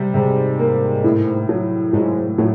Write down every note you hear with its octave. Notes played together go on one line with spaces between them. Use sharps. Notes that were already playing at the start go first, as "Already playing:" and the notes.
Already playing: C3 G3
G#2 C3
A#3
A2
F#3
G#2 F#3
A2 F#3